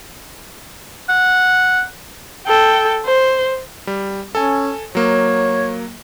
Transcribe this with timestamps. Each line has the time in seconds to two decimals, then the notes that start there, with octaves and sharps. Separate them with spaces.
1.09 F#5
2.47 A4 G5
3.06 C5
3.87 G3
4.35 C#4 A4 G#5
4.95 F#3 A#3 C#5